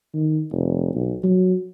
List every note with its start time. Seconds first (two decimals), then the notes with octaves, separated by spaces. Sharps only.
0.14 D#3
0.52 F1
0.94 B1
1.23 F#3